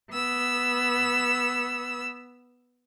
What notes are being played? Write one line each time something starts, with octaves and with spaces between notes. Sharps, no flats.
B3 E6